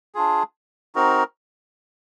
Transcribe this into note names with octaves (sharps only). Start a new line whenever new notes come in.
D4 F4 G#4
C4 D#4 F#4 A#4